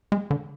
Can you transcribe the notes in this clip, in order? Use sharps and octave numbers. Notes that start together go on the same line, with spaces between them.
G#3
D3